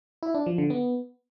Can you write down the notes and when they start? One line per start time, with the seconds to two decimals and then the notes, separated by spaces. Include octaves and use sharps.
0.23 E4
0.34 D4
0.46 F3
0.58 D3
0.70 B3